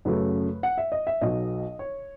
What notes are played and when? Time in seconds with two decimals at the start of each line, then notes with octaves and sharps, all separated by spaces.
0.05 F#2 C#3 F#3 A3 B4
0.63 F#5
0.78 E5
0.92 D#5
1.07 E5
1.21 B1 B2 F#3 D#5
1.79 C#5